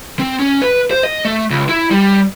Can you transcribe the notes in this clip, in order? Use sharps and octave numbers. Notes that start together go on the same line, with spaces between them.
C4
C#4
B4
C5
D#5
A3
C#2
E4
G3